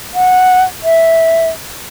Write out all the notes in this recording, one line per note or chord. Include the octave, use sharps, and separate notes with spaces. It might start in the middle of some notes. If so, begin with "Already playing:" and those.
F#5
E5